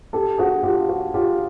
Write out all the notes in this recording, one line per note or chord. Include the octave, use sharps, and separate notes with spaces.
G4 A4
F#4 G#4
F4 G4
F#4
F4 G4